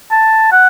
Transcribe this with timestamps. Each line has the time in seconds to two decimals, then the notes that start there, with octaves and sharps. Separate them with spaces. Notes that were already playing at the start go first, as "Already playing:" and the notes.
0.11 A5
0.52 F#5